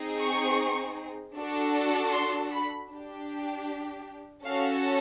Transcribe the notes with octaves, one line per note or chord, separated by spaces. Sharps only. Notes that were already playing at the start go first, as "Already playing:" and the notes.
Already playing: C4 D#4 G#4
C#6
D4 F#4 A4
C6
B5
D4 G4
C#4 F#4 A4 F5